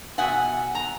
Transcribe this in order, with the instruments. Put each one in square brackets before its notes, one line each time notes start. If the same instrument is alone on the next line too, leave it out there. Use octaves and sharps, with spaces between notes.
[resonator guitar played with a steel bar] B2 E5 F#5 G#5
A#5